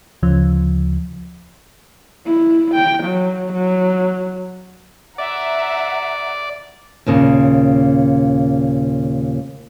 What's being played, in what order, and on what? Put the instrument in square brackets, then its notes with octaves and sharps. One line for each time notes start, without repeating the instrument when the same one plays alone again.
[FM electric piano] D2 C#3 F3
[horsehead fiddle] E4
G5
F#3
F#3
[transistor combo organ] D5 [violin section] E5 F#5 A#5
[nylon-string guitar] D#2 A#2 C#3